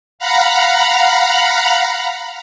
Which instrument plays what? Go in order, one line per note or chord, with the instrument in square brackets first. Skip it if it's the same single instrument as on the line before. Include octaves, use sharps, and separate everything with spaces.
[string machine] F5 F#5 A#5 B5